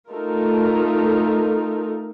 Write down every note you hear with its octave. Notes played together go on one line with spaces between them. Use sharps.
A3 D#4 F4 A4 A#4